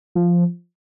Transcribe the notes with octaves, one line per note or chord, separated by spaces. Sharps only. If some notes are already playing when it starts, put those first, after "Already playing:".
F3